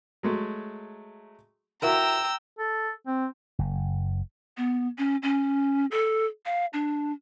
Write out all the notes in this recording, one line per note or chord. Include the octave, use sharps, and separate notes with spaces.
F#3 G#3 A3
E4 F#4 A#4 G5 A#5 E6
A4
C4
F#1
B3
C#4
C#4
A4
F5
D4